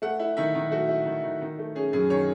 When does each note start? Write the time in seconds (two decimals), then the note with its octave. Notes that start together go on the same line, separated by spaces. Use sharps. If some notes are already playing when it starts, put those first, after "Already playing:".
0.02 A3 F#5
0.20 E4
0.37 D#3 E5
0.55 D#3
0.71 A3 F#4
0.89 E4
1.06 D#3
1.23 D#3
1.41 D#3
1.59 A3
1.75 C#4 G#4
1.93 F#2 G#4
2.10 D#3 C#5